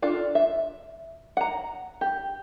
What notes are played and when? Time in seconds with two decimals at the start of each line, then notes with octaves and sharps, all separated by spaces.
0.02 D4 F4 A4
0.35 E5
1.37 F#5 A#5
2.01 G4